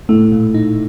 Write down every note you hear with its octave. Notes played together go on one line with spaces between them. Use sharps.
A2 A3
A#2
D#4